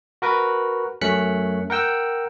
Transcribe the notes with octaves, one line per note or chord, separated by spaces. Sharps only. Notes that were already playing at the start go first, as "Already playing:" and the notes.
F#4 A#4 B4
F#2 A3 C#4 F#6 B6 C#7
A#4 F#5 G5 E6